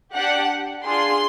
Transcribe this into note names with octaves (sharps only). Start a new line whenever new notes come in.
D4 G4 F#5
D4 F4 G#4 C6